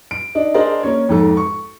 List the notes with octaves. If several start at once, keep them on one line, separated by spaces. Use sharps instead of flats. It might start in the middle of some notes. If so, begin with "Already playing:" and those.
D7
D4 D#4
D4 G#4 A#4 C5 D5 D#5
A#3 C#4 C#5
F2 G#2 A4
C#6